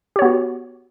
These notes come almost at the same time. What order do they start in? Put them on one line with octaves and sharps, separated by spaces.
G4 C#5 B3 F#4